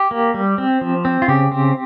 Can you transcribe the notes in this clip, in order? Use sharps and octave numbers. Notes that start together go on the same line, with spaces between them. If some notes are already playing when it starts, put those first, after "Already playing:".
Already playing: G4
A#3
G3
C4
F3
C4
F4
C#3 G4
C4